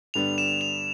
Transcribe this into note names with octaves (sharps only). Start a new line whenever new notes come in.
G2 D3 G3 B3 D4 F7
E7
F7